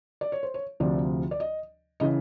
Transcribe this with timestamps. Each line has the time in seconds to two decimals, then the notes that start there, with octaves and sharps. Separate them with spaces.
0.21 D5
0.32 C#5
0.43 C5
0.54 C#5
0.80 D2 C3 F3 D5
1.31 D5
1.40 D#5
2.00 C#3 E3 D#5